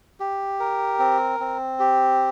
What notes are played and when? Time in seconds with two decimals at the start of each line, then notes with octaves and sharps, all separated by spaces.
0.20 G4
0.60 A#4
0.99 C4
1.40 C4
1.80 G4